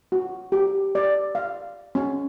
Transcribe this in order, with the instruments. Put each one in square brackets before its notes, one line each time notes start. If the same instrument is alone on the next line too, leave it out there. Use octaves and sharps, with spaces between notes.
[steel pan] F#4
G4
D5
F5
C#4